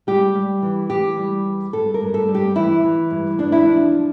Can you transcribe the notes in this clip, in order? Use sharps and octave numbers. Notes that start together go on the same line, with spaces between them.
G3 G4
G3
E3
E3 G4
G3
E2
G2 A4
A#4
G2
A4
G3
G4
E3 E4
E3
G2
E2 D4
E4
F3 D4
F3